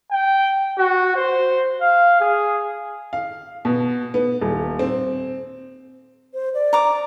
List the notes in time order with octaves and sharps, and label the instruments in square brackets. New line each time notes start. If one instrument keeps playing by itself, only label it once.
[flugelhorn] G5
F#4
C5
F5
G#4
[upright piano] F5
B2
B3
D#1
C4
[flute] C5
D5
[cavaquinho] A#5 D6